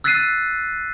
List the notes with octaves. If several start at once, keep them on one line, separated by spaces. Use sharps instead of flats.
E6 F#6 A6 B6 C7 D#7